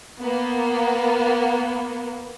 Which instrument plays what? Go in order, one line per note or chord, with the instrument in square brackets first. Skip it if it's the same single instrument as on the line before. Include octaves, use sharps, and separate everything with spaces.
[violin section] A#3 B3